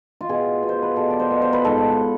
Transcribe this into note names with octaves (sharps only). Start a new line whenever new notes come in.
F4
B2 G#4
B2
C5
B4
B2 A4
D5
C5
B2
C5
B4
G#2 A4